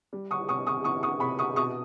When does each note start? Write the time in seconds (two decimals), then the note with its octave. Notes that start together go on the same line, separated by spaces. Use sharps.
0.13 G3
0.31 C#6 D#6
0.49 C3 C#6 D#6
0.67 C#6 D#6
0.84 E3 C#6 D#6
1.03 C#6 D#6
1.20 C3 B5 C#6
1.39 C#6 D#6
1.56 B2 C#6 D#6